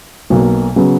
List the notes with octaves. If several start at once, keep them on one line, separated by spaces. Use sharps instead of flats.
B1 B2 A#3
C#3 F#3 B3